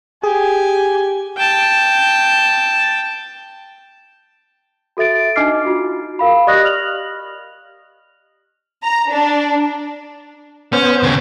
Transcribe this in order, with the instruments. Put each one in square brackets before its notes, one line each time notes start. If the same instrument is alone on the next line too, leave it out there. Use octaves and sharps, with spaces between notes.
[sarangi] G4 [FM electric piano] G#4 [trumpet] G#5
[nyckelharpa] G5 A5
[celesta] F#4 A4 E5 A6 D7
D4 D#4 D#5 D6 F6 C7
F4 F#4
A#4 F5 B5
G4 D5 D#5 D#6 F#6 A#6
F6 F7 F#7
[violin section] A#5
D4
[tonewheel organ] B3 C5 [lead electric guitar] C#4
[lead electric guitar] D#2 C#3